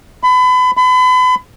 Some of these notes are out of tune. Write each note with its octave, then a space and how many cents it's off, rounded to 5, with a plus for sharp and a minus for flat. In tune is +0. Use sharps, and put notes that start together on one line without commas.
B5 +30
B5 +35